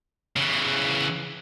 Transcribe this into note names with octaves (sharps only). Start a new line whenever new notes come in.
C#3 E3